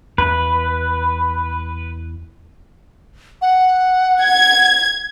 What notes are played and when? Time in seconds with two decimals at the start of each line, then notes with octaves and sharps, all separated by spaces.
0.18 E2 B4
3.42 F#5
4.22 G#6